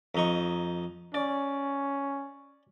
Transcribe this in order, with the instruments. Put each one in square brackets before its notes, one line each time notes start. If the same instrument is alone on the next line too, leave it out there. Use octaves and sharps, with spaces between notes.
[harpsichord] F2 D#4 C#6
[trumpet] C#4 [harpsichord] D5